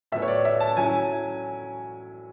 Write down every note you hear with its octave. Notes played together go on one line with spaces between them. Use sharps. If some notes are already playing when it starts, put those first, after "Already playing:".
A2 F#3 B3 E5
C#5
D5
E5
A5
F#3 C#4 E4 G#5